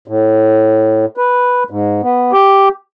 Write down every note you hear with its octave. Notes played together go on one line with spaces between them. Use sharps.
A2
B4
G#2
B3
G4